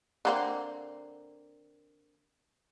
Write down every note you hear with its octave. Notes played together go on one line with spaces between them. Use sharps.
D3 A#3 C4